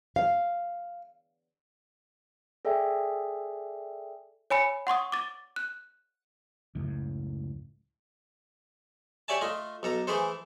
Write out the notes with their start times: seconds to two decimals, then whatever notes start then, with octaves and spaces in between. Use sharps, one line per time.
0.16 F5
2.65 G#4 A4 D5 E5 G5 G#5
4.50 C#5 G#5 B5 C#7
4.87 F#5 C6 C#6 D#6
5.12 D6 A6
5.56 F#6
6.75 C#2 F#2 A2
9.28 G4 C#5 D5 E5 G#5 A5
9.41 A3 F4 D#5
9.83 B1 A4 A#5
10.07 E3 A3 E4 G#4 A4 C5